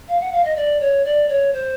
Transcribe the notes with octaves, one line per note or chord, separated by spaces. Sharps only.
F5
F#5
F5
D#5
D5
C#5
D5
C#5
C5